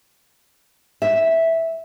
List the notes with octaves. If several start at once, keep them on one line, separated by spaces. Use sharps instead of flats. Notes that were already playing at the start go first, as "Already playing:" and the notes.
E5